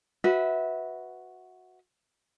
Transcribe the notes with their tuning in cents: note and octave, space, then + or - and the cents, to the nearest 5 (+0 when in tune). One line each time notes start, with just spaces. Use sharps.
F#4 -5 B4 +0 E5 -25